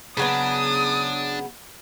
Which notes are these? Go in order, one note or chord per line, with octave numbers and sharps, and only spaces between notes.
C#3 F#3 B3 D4 D#6